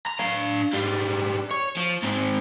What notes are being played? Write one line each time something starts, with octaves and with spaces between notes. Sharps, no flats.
A#5
D4 F5
G#2 G3
C#5
F3
G#2 C4